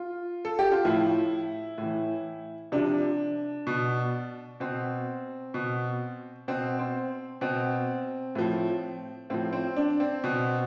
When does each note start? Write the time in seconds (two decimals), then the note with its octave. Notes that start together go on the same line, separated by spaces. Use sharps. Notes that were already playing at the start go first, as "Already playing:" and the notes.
Already playing: F4
0.45 A4
0.59 G4
0.72 F4
0.85 A2 F3 E4
1.78 A2
1.83 E3
2.72 C3 F3 D4
3.67 B2
4.60 B2 C4
5.54 B2
6.48 B2 C4
6.79 C4
7.41 B2 C4
8.35 A2 F3
9.30 A2 F3 C4
9.53 C4
9.77 D4
10.00 C4
10.24 B2